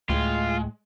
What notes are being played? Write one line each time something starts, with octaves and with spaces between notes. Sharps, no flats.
D2 A2 G#3 F4 G5